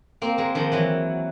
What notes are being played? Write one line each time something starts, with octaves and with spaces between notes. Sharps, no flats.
A#3 C4
G#3 A#3
D#3 F3
E3 F#3